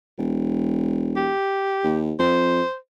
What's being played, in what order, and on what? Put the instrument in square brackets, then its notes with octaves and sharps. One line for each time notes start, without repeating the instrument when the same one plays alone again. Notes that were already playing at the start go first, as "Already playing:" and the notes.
[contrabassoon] E1
[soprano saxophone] G4
[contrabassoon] D#2
[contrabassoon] F2 [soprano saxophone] C5